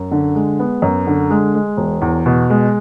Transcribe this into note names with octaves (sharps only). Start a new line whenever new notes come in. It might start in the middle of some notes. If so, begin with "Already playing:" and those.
Already playing: F#2
D3
G#3
B3
F#2
D3
G#3
G#3
E1
E2
B2
G#3